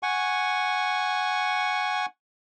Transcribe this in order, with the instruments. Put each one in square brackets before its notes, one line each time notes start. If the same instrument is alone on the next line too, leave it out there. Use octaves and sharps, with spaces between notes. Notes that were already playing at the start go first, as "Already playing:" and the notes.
[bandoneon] F#5 G#5 C#6